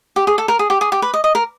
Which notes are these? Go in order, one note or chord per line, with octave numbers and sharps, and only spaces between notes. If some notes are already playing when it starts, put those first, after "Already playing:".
G4
G#4
A4
A#4
G#4
G4
G#4
G4
B4
D#5
D#5
A#4